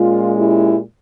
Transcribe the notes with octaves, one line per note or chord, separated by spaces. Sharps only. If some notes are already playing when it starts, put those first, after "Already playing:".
Already playing: A#2 G#3 C#4 F4
E4 G4